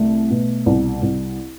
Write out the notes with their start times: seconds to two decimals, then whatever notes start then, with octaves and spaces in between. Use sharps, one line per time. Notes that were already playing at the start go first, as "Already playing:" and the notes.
Already playing: C2 A3
0.30 B2
0.66 C2
1.02 C2